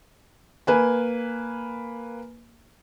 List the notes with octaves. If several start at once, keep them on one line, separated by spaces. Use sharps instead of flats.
A#3 B4 G#5